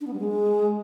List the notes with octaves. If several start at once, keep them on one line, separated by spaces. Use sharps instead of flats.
D4
B3
G3
G#3